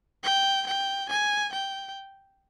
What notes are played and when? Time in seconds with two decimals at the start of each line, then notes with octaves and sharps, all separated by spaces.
0.23 G5
0.67 G5
1.09 G#5
1.53 G5